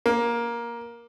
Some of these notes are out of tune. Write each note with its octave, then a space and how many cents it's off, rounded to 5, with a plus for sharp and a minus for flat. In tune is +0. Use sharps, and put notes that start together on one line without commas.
A#3 +15